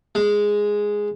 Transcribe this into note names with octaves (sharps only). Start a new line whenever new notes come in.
G#3